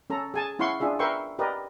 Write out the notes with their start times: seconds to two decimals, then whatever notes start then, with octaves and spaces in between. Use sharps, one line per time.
0.10 C#4 A4 A#5
0.34 G#4 G#5 A5
0.59 C#4 E4 F5 F#5 C6 C#6
0.80 D4 F4 G#4 E5
0.99 A#4 B4 E5 G5 C6 C#6
1.39 G4 A#4 B4 D5 D#5